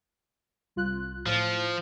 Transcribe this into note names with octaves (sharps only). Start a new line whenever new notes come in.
C2 F4 F#6
A2 F3